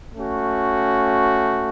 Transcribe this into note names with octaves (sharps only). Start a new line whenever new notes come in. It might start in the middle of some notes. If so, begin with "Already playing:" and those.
A3 C#4 F#4